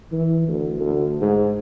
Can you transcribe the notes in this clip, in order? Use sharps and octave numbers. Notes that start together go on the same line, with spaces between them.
E3
D2
D2
G#2